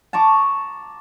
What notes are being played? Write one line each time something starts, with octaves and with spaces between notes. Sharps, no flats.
A5 A#5 C#6 D6